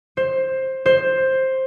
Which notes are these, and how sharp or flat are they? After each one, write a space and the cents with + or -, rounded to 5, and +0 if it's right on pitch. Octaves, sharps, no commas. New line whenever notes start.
C5 +15
C5 +10